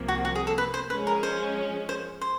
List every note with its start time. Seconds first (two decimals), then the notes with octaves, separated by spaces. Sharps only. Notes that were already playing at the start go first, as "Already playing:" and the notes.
Already playing: C2 C3 F3 A#3
0.08 F#4
0.25 F#4
0.35 G#4
0.47 A4
0.58 B4
0.74 C5
0.90 F3 G#3 C#4 B4
1.07 A#4
1.23 C5
1.89 C5
2.21 C5